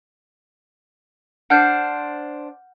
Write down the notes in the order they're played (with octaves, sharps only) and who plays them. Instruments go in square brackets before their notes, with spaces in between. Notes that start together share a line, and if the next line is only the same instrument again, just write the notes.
[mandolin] D4 C5 [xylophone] F#5 F6 G6